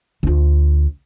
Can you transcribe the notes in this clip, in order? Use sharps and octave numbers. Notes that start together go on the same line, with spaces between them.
D2 F4